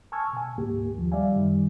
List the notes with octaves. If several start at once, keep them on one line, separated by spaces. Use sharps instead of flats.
G#5 A5 C#6 E6 F6 G#6
B2 G#5
D2 G#2 A#3 G4
D#2 F3
G3 D5 E5 F5 G#5
F#2 D#3 G3